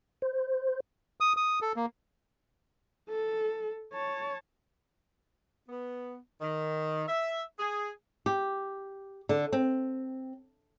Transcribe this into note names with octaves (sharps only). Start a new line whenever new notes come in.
C5
D#6
D#6
A4
A#3
A4
C#5 A5
B3
D#3
E5
G#4
G4
D3
C4